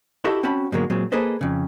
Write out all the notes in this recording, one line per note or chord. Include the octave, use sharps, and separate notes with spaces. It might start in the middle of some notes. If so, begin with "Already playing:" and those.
E4 F#4 G4 A4 D#5 E5
C4 C#4 F#4 A5 B5
G#2 B2 D3 F#3 G#3 A#3
A#2 F#3 G#3 C4
A#3 G#4 A4 B4 C5 D#5
F2 C#3